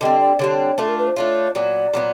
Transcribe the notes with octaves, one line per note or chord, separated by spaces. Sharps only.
D3 G3 C4 D#5
D5
D3 G3 C4 C#5
A3 D4 F4 A4
A#4
B4
C5
A3 D4 F4 C#5
A#2 F#3 B3 D5
A#2 F#3 B3